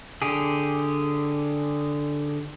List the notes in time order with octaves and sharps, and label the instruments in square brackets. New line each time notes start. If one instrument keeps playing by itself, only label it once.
[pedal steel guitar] D3 G4 G#4